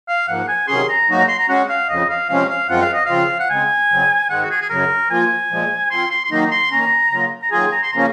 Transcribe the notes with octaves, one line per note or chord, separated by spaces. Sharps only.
F5
G#2 F3 A#3 F#5
G#5
C3 D#3 F#3 C#4 G#4 C6
A#5
G#2 F#3 A#3 D#4 F#4
A#5
C6
A#5
G#3 C#4 F#4 F#5
F5
F2 C#3 F3 D#5
F5
C3 F3 G#3 C#4 F5
F5
F#2 F3 G#3 C4 F4 F#5
F5
D#5
C#3 F3 C4 F4 F5
F#5
C#3 G#3 C4 G#5
F2 C#3 F#3 C4
G#2 D#3 G#3 F#5
F#4
G#4
G#4
F#2 C#3 F#3 A#4
F3 A#3 F4 G#5
A#2 F3 G#3
F3 C4 F4 C6
C6
C6
D#3 F#3 A#3 D#4 A#5
C6
D#3 A#3 C#4 A#5
C#3 F#3 A#3 F4
A#5
D#3 F#3 A#3 F4 G#4 G#5
A#5
C6
C#3 F3 A#3 C#4 A#5